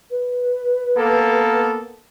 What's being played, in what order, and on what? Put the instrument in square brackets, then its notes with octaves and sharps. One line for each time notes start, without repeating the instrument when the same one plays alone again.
[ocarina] B4
[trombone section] A#3 B3 A4